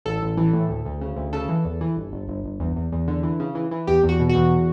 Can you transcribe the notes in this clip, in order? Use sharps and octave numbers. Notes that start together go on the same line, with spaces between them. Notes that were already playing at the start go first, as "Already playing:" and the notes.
A1 A4
A1
E3
A2
D2
D2
C#3
D2
C#3 A4
E3
E2
E3
G1
G1
G1
G1
E2
E2
E2
D3
E3
C#3
E3
E3
E2 G4
E2
F#4
B2
F#4
E2